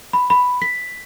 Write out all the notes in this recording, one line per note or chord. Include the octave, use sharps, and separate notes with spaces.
B5
B5
B6